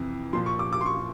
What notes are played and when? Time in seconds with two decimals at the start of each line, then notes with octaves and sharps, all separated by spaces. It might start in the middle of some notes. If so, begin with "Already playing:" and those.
Already playing: F2 C3 E3
0.33 A#2 F3 C6
0.46 C#6
0.59 D6
0.73 D6
0.81 C6
0.86 C#6